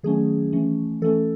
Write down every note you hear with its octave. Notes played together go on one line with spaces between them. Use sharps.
D#3 F#3 A3 C#4 G#4
E3 A3 C#4
E3 A3 C#4 A4